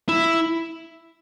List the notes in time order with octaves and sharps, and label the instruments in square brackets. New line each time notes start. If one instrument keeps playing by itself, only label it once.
[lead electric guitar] E4